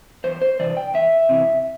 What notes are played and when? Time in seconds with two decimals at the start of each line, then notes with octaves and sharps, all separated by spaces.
0.24 E2 C5
0.42 C5
0.59 C3 E3 D5
0.77 G5
0.94 E2 E5
1.29 C3 E3